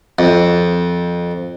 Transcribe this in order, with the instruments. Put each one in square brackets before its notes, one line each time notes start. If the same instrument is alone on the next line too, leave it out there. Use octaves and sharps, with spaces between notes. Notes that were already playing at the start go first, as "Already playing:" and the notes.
[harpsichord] F2